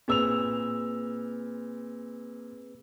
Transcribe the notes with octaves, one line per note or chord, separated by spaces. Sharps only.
A#2 C4 G#4 B4 E6 F7